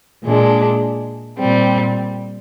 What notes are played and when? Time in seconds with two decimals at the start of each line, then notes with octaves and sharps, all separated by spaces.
0.24 A#2 G#3 D4
1.38 A#2 G3 C4